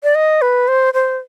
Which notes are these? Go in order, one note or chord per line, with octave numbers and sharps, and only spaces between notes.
D5
D#5
B4
C5
C5